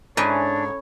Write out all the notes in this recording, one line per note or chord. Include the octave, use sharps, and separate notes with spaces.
G#2 C#4 D4 E4 A4 B4 C#5 G#5